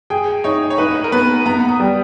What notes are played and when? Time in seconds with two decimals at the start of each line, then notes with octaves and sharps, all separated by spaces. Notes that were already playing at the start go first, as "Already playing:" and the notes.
0.10 G#4 G5
0.44 D#4 C#5
0.70 C#5
0.78 D#4 B4
1.04 A#4
1.12 B3 B4
1.46 B3 A#5
1.69 D#6
1.80 G3